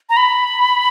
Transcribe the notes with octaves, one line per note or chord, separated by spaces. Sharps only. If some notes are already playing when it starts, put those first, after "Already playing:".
A#5
B5